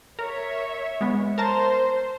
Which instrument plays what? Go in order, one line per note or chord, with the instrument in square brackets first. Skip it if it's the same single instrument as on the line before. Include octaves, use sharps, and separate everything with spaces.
[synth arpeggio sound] A#4 [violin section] C#5 E5
[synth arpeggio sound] G#3 B3
[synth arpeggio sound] A#4 A5 A#5 [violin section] C5